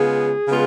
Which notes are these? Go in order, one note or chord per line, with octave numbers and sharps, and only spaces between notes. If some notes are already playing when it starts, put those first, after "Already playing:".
Already playing: C#3 G#3 B3 F4 G#4
C#3 G#3 B3 F4